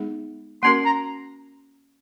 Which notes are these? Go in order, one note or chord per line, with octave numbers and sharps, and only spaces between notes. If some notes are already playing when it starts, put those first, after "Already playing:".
Already playing: G#3 B3 D#4 G#4
A#3 C#4 F#4 A#4 C6
A#5